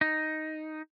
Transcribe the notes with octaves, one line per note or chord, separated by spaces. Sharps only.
D#4